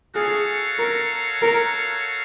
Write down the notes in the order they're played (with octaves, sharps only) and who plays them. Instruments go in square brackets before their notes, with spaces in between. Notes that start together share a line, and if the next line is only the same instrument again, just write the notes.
[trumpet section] F#4 A4 C#5 F5 [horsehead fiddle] G#4
[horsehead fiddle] A#4
A#4